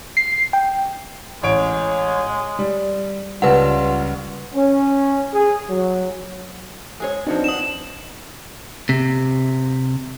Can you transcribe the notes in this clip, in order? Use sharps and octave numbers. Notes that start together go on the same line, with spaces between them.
C7
G5
A1 G#3 C#5 D7
G3
C#2 G3 F4 B4 F#5
C#4
G#4
F#3
G#3 G#4 C#5
F3 B3 C4 D4 D#4 F#4
D#6 E7
C3